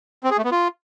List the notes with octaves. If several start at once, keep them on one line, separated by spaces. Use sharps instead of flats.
C4
G#4
A3
B3
F4